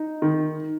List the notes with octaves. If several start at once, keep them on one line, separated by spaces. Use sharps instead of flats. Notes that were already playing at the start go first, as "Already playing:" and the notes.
Already playing: D#4
D#3